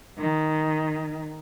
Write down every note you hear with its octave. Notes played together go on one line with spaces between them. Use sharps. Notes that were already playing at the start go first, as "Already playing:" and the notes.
D#3